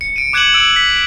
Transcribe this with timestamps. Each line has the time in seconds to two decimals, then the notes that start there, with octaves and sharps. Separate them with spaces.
0.01 C#7
0.16 D7 D#7
0.33 D6 F#6 G#6 C#7 E7 F#7
0.54 E6 D7
0.76 B6